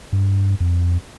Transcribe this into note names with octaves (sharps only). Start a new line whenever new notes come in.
G2
F2